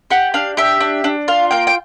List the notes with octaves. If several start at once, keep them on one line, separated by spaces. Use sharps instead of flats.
G4 F#5
D4 F5
G4 E5
D4
D4
F4 F5
A#3 G5
G5